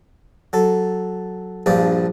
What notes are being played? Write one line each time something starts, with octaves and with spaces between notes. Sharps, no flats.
F#3 A4
A#1 G2 F3 D5